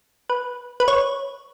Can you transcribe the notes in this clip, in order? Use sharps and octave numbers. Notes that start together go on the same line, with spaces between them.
B4
B4
C#5